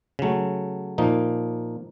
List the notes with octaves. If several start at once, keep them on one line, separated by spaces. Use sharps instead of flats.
C#3 F#3 A3
A#2 F3 A#3 D#4